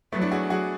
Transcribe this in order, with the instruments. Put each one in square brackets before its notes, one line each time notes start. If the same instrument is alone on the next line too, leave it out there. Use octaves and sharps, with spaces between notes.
[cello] F#3 [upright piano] A3 B3
[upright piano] D4 E4
F#4 G#4
F#4 G#4